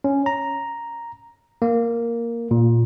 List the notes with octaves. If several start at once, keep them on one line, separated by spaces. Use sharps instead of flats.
C#4
A#5
A#3
A#2